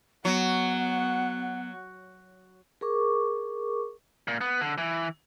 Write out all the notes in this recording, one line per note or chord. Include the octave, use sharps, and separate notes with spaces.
F#3 B3 F#5
G#4 A#4 C#6 D6
A#2
B3
D3
E3